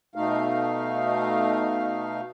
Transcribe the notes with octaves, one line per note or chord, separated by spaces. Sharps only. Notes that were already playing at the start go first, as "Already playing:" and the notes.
B2 A3 D#4 F5